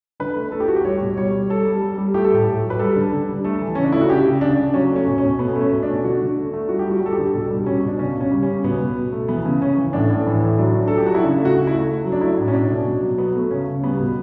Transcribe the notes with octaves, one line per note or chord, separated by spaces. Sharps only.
D3 B4
A3
A3 A4
G4
A3 F#4
G4
G3 C#5
B2
G3 C#5
G3
G3 A4
G3
G3
G3
A3 G4
A4
A2 G4
A2
F#3
B4
G3 A4
D3
D3
G3
A3 A4
E3
C#3 C#4
D4
A3 E4
F#4
C#3 G4
C#3
C#3 D4
C#3
F#3 C#4
A3
C#4
B2
C#4
B2
A3 B3
A3
C#4
B2
D4
A3
D3 F#4
D3
A3
A3
G3 F#4
G4
G3
F#4
G3 A4
G4
D3
B2 A4
G3
B2 C#4
B2 D4
C#3 C#4
C#3
C#4
G3
C#4
C#3
B2 B3
B2
B2
A3
E3 B3
C#3
C#3 C#4
E3
A2 D4
A2
E3
A2
F#3 D4
D3
F#3 A4
G4
F#3 F#4
E4
C#3 D4
A3
F#4
C#3
E4
A3
A3
F#3
D4
A3 E4
A2
C#4
B2 D4
B2
B2
F#3
F#3 B3
A3
C#3 C#4
C#3
G3 B3
B2